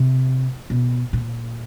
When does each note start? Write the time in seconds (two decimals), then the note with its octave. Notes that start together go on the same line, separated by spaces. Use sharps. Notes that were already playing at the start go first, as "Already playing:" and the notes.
Already playing: C3
0.70 B2
1.13 A#2